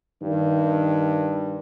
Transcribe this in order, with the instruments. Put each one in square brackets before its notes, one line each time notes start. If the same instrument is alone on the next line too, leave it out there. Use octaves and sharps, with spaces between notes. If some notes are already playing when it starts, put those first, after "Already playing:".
[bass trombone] G2 [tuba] D#3